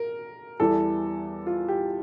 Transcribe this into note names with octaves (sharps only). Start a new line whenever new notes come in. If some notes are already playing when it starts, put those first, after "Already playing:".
Already playing: A#4
E2 E3 G3 A4
F4
G4